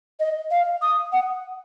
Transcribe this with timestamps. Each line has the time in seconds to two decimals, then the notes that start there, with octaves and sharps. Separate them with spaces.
0.19 D#5
0.50 F5
0.81 D#6
1.12 F#5